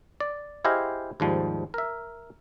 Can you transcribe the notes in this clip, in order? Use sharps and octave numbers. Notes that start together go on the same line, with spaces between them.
D5
E4 G4 G#4 C5 D#5 F5
D#2 G#2 F3 G3
A#4 E5